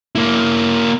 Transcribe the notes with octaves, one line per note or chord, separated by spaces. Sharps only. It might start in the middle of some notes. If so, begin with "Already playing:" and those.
A#3 E4